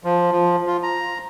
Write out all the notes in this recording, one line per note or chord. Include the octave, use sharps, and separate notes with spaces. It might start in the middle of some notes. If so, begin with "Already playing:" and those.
F3
F3
F4
A#5